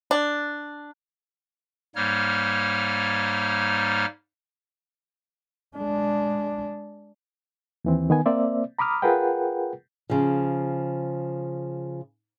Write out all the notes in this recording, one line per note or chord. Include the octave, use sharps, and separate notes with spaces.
D4
G#2 G3 A#3 D#4 C#5 F6
G#3 D4
D#2 E3 C4
D#3 B3 G#5
A#3 C4 C5 D5 E5
A#5 B5 D6 D#6 F6
F4 G#4 A#4 B4 F#5 G5
C#3 F3